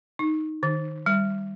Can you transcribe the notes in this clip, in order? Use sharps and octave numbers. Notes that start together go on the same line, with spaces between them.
D#4
D#3
G3